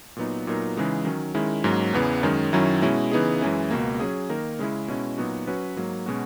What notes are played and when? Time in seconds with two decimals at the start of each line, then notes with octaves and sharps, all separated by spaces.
0.17 A#2 F#3 B3 D#4
0.47 A#2 F#3 B3 D#4 A#4
0.77 C#3 E3 G#3 D#4
1.05 D#3 F#3 C#4
1.34 D#3 G#3 C#4 E4
1.64 G#2 F#3 A#3 C#4
1.93 E2 C#3 E3 B3
2.23 F#2 D#3 G#3 C#4
2.53 F#2 D#3 F#3 C#4 E4
2.82 B2 G#3 C#4 E4
3.11 C#3 E3 B3 D#4 G#4
3.41 F#2 E3 G#3 C#4 E4
3.71 C#2 B2 A#3
4.00 F#3 C#4 G#4
4.29 D#3 A#3 D#4 A#4
4.59 C#3 G#3 C#4 E4
4.88 B2 G#3 C#4 E4
5.18 A#2 F#3 B3 D#4 F#4
5.47 F#3 C#4 F#4 B4
5.76 G#2 F#3 A#3
6.06 B2 G#3 C#4 F#4